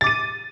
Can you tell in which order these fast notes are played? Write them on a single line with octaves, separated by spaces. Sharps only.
A6 D6 D#7